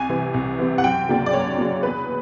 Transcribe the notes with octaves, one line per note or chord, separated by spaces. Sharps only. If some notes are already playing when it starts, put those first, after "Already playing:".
Already playing: C2 G#5
C3 E3
C2
C3 E3
F#5
F#2 G5
C#3 F#3 A#3 D4
D5
F#2 C#5
C#3 F#3 A#3 D4
E2 B4